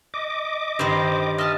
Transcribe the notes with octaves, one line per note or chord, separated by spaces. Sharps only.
D#5 D6
G2 D#3 C5
D#5 E5 A5 F6